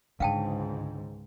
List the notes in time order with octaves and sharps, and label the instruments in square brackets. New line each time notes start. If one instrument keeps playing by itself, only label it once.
[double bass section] C#2 G#2 [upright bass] D3 [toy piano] F5 G5 A5